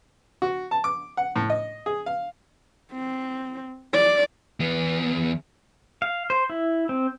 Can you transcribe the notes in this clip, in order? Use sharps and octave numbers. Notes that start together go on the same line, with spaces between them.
F#4
A5
D6
F#5
A2
D#5
G#4
F5
C4
D5
E2 B3
F5
C5
E4
C4